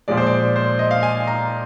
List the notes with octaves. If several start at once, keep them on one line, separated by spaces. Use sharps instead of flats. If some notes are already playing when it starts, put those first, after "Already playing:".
A#2 F3 G#3 D5
C5
D5
C5
D#5
F5
G#5
A#5